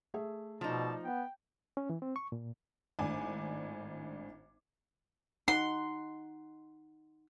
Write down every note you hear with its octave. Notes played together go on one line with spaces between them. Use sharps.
A3 G#4 E5
B2 F3 D#4 D5 A5
B3 G5
C#4
E3
C4
C#6
A#2
G#1 A2 D4 G#5 D6
D#4 F#5 C6